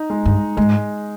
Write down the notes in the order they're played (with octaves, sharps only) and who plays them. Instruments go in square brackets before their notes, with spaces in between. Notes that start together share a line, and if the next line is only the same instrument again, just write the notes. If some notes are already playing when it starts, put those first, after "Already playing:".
Already playing: [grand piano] D#4
G#3
[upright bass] G2
[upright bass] G#2 [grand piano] G#3